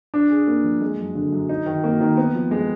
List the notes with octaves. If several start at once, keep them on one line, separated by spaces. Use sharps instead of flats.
D4
G#4
A#3
F3
G#3
F#2
D3
F#2
D#4
D#3
A#3
D#3
B3
F3
G#3